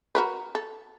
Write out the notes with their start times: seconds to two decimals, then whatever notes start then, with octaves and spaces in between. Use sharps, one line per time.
0.15 F#4 A#4 B4
0.55 A4